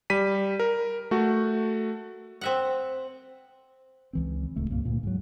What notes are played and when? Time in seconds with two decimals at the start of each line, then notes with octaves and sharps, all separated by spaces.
0.10 G3 B6 D#7
0.60 A#4
1.11 A3 F#4
2.41 C4 E5 F#5
4.13 C#2 E3 C4
4.56 D1 C#2 A3
4.70 C2 G2 A#2 A#3
4.85 D2 A#2
5.03 G#2 F#3